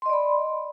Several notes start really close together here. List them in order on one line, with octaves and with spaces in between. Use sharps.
C6 D#5 D5 B5